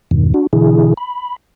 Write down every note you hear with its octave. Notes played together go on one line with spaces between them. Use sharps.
E2 G2 B2 D#3
D4 F#4
B2 D3 E3 E4 G#4
B5